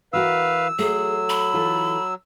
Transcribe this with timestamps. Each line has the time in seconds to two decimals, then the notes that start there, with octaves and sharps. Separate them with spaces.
0.13 E3 F#4 A#4 B4 F5 E6
0.79 F#3 A3 G#4
1.30 B5
1.54 E3 F4 A4